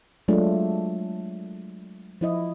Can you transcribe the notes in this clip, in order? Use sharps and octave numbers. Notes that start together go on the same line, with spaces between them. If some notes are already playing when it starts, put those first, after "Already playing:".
F#3 G#3 A3 D4 F4
F3 E4 D#5